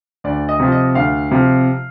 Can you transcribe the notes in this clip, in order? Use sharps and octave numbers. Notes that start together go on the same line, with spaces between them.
D2 D5
D#5
C3 F3
D#5
D2 F5
C3 F3